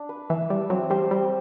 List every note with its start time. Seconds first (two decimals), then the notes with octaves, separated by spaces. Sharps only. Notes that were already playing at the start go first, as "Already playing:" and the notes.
Already playing: D4
0.09 B4
0.29 E3 E5
0.49 G3 E5
0.70 F#3 C4
0.90 G3 C5
1.11 G3 C4